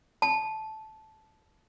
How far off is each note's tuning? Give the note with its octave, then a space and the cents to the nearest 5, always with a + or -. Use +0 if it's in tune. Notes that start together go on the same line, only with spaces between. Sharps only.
A5 -10